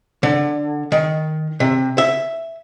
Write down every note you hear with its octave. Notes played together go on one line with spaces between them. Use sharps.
D3
D#3
C3
E5